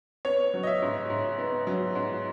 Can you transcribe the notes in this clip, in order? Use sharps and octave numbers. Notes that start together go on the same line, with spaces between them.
B3 C#5
F#3
D#5
E5
G#2
G#2
B3
F#3
G#2